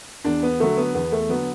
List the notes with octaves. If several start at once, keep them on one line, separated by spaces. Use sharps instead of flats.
E2 D4
B3
D3 F#3 A3
B3
E2 B3
A3
D3 F#3 B3